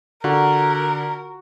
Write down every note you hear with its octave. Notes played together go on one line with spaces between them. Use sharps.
D3 F#4 A#4